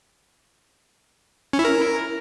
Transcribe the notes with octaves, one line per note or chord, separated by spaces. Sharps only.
C#4
E4
A#4